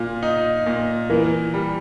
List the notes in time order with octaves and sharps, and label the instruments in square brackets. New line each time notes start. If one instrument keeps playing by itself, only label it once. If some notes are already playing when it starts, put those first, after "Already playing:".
Already playing: [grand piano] A#2 [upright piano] F4
[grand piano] D#4
A#2
[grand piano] E3 [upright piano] A#4
[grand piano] G3